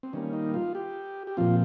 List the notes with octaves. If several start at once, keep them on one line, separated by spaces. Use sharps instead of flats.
C4
D#3 G3 A#3 C#4
D#4
F4
G4
G4
A#2 F3 C4 F4